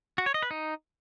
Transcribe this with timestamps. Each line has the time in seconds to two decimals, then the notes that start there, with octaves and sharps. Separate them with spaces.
0.18 F#4
0.26 C#5
0.34 D#5
0.43 B4
0.51 D#4